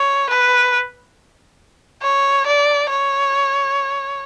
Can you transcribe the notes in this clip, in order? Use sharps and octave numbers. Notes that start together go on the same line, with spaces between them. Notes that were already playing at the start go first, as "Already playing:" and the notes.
Already playing: C#5
B4
C#5
D5
C#5